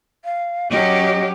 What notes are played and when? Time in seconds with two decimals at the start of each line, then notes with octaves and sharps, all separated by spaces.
0.25 F5
0.71 F#3 C#4 G4 D#5